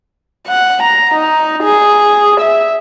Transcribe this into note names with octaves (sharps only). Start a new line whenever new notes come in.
F#5
A#5
D#4
G#4
E5